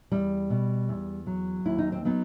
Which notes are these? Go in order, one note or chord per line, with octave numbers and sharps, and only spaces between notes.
E2 G3
B2
E2
F#3
D#2 E4
D#4
C4
F#3 B3 D#4